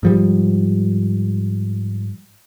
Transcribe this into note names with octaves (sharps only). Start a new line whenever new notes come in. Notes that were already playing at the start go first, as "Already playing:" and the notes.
G#2 F3 G3